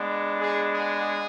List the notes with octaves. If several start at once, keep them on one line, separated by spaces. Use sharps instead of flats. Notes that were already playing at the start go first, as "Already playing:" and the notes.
Already playing: G#3 B3 D4
G#4
G#4